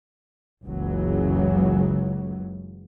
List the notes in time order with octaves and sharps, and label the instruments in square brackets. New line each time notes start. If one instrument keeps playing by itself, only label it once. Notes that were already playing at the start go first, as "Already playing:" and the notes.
[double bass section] F#1 C#2 C#3 E3 F#3